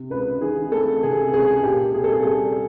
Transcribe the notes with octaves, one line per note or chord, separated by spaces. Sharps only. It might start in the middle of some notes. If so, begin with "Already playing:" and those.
Already playing: C3
C#2 B4
E3 G#4
A3 A4
C3 G#4
C#2 G#4
A#2 G4
C2 G#4
A4
G#4
G3 G#4